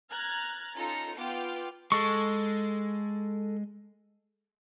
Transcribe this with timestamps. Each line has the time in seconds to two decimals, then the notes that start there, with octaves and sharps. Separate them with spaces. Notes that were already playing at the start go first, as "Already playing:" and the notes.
0.11 A#5 F6 F#6 G#6 A6
0.75 C#4 D#4 F4 A4 A#5 C#7
1.15 B3 F4 G5 D6 F6
1.92 G#3 A4 C#6